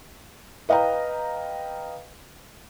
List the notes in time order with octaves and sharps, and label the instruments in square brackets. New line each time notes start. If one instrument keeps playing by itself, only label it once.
[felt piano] B4 D#5 F5 G5 A#5